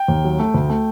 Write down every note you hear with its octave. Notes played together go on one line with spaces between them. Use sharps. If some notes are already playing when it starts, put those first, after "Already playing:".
Already playing: G5
D#2
F#3
A3
D2
A3